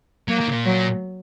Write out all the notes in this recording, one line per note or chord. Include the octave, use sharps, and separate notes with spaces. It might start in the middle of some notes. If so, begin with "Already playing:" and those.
F#3 A#3
D#3
C#3
A#2
F#3